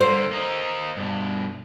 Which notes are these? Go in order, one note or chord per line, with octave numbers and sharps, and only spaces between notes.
D3 A#3 C5
A#3 D#4
G2 B2